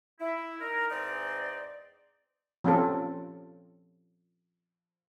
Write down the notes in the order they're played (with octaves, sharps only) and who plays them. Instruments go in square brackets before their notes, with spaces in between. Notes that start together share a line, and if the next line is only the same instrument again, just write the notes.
[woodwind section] E4
D#4 A#4
E2 G#2 C4 D#4 D5
[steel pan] F3 C4 C#4 F4 A4